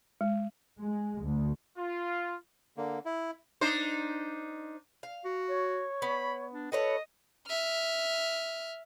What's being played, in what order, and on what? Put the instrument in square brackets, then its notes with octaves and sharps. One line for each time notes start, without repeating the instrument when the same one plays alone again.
[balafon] G#3
[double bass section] G#3
D2
[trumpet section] F4
[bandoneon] D3 A#3
E4
[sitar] D4 D#4 C5
[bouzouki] F5
[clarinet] F#4
[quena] C#5
[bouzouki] B3 [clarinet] B5
[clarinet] D4
[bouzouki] F#4 B4 C#5 [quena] A4 [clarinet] D#5
[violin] E5 F6